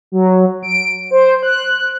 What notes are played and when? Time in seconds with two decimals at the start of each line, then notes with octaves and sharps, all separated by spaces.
0.12 F#3
0.63 D7
1.11 C5
1.43 F#6